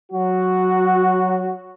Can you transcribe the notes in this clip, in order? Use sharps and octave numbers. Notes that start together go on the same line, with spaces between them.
F#3 F#4